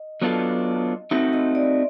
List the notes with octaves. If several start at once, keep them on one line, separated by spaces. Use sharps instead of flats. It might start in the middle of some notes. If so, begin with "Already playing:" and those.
Already playing: D#5
F#3 B3 D4 F4 A4
A3 C4 D#4 F#4 E5
D#5
D5